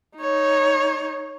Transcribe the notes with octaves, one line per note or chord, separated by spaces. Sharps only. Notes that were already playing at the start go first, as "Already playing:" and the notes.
D#4 C#5